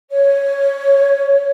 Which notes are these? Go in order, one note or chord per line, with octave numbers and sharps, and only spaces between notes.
C#5